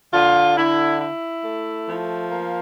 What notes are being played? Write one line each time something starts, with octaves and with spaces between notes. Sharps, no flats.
D3 F4
D3 E4
E4
A3
F3
A#3